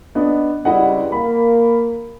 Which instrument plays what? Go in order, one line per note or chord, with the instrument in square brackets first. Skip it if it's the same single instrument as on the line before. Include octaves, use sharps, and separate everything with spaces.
[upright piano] B3 D4 D#5
[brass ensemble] C#2 G2 G3 [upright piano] E4 D#5 F#5
[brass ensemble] A#3 [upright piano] B5